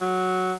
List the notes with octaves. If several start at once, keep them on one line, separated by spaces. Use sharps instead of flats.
F#3